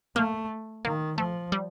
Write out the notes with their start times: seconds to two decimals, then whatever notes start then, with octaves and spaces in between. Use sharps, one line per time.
0.16 A3 A#3
0.85 D#3 A#3
1.18 F3 A3
1.52 G3